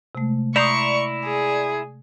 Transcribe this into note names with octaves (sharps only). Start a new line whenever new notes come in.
C3 G#3 A3
E4 D5 A#5 C6 C#6 D#6 G6
G#4